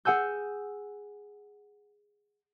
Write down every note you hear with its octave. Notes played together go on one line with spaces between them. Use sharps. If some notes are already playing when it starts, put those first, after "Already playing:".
G#4 F#5 G#5 E6 G6